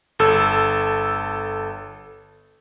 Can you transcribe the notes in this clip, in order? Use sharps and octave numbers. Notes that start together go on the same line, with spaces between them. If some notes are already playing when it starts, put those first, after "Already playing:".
G1 A4 E6